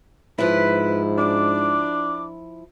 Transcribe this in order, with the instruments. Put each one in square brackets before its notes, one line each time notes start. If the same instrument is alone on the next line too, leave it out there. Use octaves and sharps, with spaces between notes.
[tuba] G#2 [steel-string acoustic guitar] F3 E4 [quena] B4
[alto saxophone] D4 [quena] D6